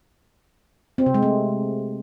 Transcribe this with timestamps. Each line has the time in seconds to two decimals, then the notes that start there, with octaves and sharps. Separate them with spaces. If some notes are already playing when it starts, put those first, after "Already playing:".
0.98 C4
1.06 C3
1.14 G#3
1.23 A3